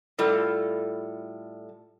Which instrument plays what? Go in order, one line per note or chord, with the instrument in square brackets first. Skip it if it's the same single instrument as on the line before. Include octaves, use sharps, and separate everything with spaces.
[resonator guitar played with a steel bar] A2 G3 F4 A4